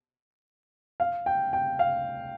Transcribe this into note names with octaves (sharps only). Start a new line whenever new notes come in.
F5
G5
G5
F5